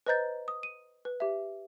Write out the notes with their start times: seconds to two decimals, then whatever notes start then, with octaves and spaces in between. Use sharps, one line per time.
0.07 B4 C5 D#5 A#5 G6 A6
0.48 D#6
0.63 D#7
1.05 B4
1.20 G4 E5